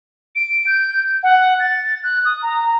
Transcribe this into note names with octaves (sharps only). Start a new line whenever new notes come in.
D7
G6
F#5
A6
F#6
D#6
A#5